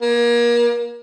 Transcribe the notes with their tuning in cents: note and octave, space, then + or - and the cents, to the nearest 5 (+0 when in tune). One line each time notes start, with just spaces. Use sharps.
A#3 +30